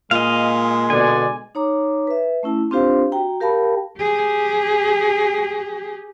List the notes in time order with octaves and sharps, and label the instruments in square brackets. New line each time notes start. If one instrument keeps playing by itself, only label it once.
[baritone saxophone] A#2 [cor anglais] G#3 [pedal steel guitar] D#5 F5
[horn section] B2 D3 D5 [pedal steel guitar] G#5
[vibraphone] D#4 C#5 A#5 D6
B4 E5
A3 C#4 E4 A5
C4 D4 F4 G4 C5 F5
F#4 G5 A#5
G4 A#4 F5 G5 A5 B5
[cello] G4 G#4